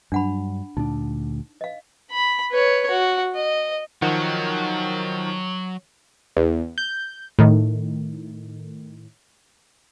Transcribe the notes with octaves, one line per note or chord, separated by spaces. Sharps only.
G2 F#3 D4 F#5 B5
D2 A#2 D4 D#4
D#5 F5
B5
B4 C#5
F#4
D#5
D#3 F3 F#3 F#5
E2
G6
A2 D#3